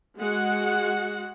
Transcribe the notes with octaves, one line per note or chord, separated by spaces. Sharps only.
G#3 F#4 F#5